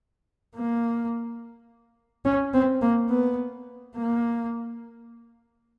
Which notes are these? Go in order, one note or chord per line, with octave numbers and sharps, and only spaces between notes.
A#3
C#4
C4
A#3
B3
A#3